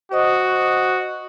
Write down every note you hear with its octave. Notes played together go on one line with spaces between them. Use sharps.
F#4 C5 D#5 D#6